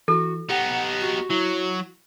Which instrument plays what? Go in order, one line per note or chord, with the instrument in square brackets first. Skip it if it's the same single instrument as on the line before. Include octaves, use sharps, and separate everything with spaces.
[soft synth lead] E3 [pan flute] F#4 [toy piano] A4
[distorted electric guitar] B3 D#4 [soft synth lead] G4 [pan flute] F#5
[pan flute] F#4
[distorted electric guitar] F#3 [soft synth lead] E4